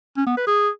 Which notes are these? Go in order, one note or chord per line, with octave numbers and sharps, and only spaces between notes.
C#4
B3
B4
G#4